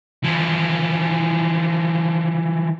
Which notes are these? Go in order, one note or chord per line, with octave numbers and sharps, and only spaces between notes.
E3 F3